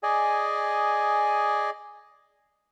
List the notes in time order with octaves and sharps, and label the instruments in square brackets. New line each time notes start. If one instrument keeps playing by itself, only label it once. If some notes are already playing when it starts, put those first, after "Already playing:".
[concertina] G#4 D5 D#5 G#5